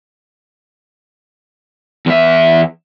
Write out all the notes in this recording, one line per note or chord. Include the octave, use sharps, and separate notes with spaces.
E2 E5